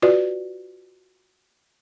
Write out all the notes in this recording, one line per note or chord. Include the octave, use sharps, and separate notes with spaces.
F4 F#4 B4 D5